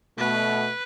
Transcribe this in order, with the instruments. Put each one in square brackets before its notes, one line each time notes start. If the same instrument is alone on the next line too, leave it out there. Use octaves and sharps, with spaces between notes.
[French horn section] B2 A3 [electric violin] B4